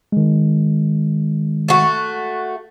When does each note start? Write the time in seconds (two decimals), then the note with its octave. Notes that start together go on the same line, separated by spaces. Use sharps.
0.12 D#3 G#3
1.68 A3 F#4